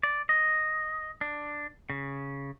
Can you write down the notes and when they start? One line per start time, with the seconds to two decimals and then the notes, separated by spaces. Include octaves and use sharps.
0.03 D5
0.29 D#5
1.21 D4
1.90 C#3